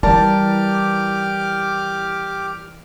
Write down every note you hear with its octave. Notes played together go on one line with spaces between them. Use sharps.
E3 G3 G4 A#4 D5 A5 D6 F6